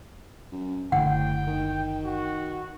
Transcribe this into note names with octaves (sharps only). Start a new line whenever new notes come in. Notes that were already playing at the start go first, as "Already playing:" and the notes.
F#2
F#1 A2 D3 F#5 G5
D#3
F#4